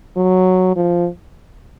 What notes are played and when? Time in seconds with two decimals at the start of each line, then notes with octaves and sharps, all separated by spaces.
0.16 F#3
0.76 F3